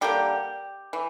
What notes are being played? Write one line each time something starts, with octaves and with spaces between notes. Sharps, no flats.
D3 G3 A#3 G4
E3